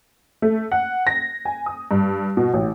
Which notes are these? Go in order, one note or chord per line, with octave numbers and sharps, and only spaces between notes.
A3
F#5
A#6
G#5
D#6
G2
B2
A1